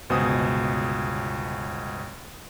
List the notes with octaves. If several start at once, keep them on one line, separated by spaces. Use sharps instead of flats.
G1 C#2 B2 C5 G#5 D#6